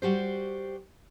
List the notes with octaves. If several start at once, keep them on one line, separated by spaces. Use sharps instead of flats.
G3 F#4 G4 C5